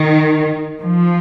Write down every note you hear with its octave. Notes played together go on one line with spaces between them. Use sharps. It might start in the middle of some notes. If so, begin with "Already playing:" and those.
Already playing: D#3
F3